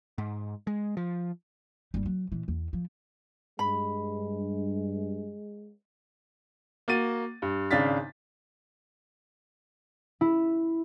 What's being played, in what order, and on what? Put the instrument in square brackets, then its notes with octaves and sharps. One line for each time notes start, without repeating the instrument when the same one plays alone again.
[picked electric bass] G#2
G#3
F3
[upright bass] G1 G3
F#3
A#2 E3
E2
F3
[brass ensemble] G2 [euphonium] G#3 [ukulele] B5
[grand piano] A#3 F#4 A6 D#7
G2
G#1 C#3 D4 F5 A6 B6
[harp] E4